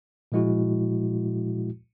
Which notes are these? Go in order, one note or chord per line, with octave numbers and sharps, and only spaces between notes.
A#2 F3 G#3 E4 F#4